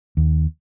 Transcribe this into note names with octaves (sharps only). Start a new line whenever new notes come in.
D#2